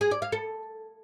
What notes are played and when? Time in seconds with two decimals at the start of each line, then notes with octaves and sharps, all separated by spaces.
0.01 G#4
0.11 D5
0.22 F5
0.32 A4